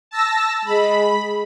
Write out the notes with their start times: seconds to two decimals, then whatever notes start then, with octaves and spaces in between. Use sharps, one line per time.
0.11 A5 E6 A#6
0.65 G#3 B5